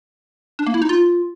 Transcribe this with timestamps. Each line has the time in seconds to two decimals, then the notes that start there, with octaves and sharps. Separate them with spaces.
0.59 D4
0.66 A#3
0.74 E4
0.82 D#4
0.89 F4